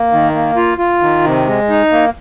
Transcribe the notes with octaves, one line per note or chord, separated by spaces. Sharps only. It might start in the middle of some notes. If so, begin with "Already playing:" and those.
Already playing: A#3
D#3
A#3
F4
F4
D#3
C3
G#3
D#4
A#3